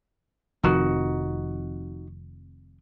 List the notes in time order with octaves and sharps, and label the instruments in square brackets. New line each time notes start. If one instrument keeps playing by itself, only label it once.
[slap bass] F1 F2 D#3 [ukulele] D#4 F#4